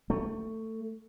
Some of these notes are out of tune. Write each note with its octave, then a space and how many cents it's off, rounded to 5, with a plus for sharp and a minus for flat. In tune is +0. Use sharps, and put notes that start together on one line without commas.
A3 +15